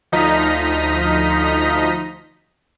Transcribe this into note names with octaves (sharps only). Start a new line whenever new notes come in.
D2 F3 D#4 D#5 A#5 B6